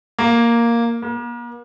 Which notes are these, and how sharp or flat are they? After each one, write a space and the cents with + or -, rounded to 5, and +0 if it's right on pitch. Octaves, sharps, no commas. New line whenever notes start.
A#3 +0
A#3 +40